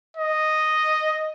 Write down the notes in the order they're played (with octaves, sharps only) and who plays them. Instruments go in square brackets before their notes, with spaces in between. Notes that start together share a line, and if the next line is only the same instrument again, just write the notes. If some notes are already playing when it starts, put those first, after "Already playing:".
[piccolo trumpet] D#5